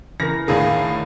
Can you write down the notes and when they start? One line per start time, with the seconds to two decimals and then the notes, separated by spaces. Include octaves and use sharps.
0.20 C#3 E3 A#4 A#6
0.48 E2 A2 D3 D#3 G#4 A#4 F5